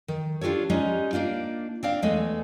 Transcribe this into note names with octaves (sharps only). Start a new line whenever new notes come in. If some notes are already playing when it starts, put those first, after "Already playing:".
D#3
D4 F4 G4 A4 C#5
G3 G#3 C#4 D#4
A#3 D4 D#4 F4
C4 D4 F5
E2 G#3 A3 B3 D#5